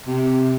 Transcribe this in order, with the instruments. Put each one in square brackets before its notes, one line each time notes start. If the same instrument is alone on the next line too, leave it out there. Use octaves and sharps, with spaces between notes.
[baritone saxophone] C3